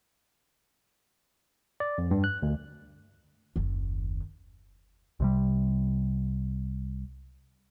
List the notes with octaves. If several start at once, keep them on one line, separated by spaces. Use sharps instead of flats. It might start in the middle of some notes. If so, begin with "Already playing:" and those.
D5
F2
G2
F#6
D2
F#1 D#2
C2 C3 G3